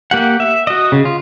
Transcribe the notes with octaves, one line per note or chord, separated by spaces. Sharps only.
A#3 G4 F#5
E5
F#4 D#5
C#3
F4